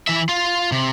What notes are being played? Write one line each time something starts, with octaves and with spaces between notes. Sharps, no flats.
E3 E5
F4
C3